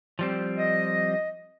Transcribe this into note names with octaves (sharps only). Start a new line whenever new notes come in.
F3 G3 C4
D#5